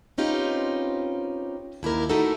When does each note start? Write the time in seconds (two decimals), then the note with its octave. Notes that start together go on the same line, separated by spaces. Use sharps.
0.18 C4 C#4 D#4 F4 G4 B4
1.83 D#2 E4 G4 A#4
2.09 A3 D#4 E4 F#4 A4 A#4